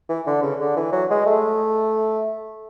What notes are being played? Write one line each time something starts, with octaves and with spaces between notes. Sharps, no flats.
E3
D3
C#3
D3
E3
F#3
G#3
A3